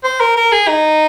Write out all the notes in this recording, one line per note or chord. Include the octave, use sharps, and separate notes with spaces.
C5
A#4
A#4
G#4
D#4